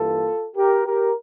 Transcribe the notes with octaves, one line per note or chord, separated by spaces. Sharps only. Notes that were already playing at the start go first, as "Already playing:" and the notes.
Already playing: G2 E3 G3 A#3 F4 A4
G4 A#4
G4 A#4